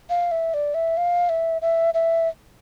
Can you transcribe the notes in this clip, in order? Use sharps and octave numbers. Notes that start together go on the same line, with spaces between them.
F5
E5
D5
E5
F5
E5
E5
E5